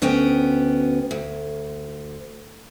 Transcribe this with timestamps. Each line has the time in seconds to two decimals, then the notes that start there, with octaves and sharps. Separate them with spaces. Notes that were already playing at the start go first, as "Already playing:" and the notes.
0.02 D2 B3 C#4 F#4 G5
1.11 D2